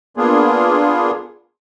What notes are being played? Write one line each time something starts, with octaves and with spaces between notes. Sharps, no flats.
A#3 B3 D4 F4 G#4